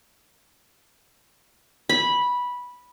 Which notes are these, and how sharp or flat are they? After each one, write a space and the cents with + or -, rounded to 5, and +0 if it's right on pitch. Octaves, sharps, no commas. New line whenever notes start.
B5 -10